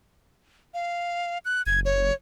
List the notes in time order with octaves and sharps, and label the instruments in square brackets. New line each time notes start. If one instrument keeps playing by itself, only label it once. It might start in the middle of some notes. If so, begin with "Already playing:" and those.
[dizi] F5
F#6
[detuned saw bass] F#1 [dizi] G#6
[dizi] C#5